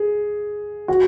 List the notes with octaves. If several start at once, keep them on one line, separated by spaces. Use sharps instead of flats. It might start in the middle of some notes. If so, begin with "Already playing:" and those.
Already playing: G#4
F#4